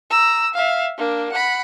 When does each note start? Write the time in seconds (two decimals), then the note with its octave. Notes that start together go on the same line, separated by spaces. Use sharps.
0.11 A#5 E6
0.54 E5 F5
0.97 A#3 D4
1.32 F#5 B5